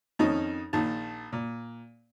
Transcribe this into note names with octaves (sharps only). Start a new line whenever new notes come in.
F2 D#3 C#4 D#4
A#1 D#3 A5
A#2